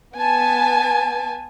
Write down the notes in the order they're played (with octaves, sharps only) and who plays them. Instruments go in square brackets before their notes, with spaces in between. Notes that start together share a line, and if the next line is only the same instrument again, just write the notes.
[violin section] B3 G#5 A5